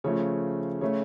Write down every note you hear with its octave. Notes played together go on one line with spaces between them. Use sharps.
C#3 F3 A3 C#5
C#3 A3 C#5